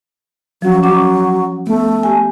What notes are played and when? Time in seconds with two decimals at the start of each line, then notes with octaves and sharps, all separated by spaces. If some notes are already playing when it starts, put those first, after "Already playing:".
0.62 F3 F#3 C#4
0.83 F#3 C#4 D6
1.67 A3 B3
2.03 G4 G#5